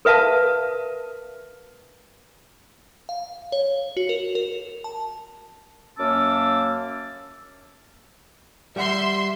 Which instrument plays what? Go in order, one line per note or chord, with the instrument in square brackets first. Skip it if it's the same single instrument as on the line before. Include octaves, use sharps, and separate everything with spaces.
[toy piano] A#4 B4 E5 F5 A5
[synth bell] F5
C#5
F#4
A#4
A#4
A5
[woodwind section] F#2 A#3 C#4 A5 D6 E6
[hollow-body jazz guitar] G3 F#5 [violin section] E5 C6